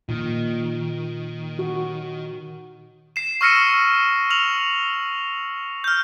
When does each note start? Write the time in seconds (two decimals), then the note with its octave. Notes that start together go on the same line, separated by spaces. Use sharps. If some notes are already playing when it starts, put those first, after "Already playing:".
0.09 A#2 D#3
1.59 F#4
3.16 C7 E7
3.41 C#6 E6 F6 A#6 C#7 D#7
4.30 F6 F7 F#7
5.84 F6 G6